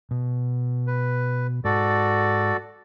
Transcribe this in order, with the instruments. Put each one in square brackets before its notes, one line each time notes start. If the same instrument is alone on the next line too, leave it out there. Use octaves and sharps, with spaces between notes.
[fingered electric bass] B2
[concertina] B4
[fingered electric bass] G#2 [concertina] F#4 A4 D5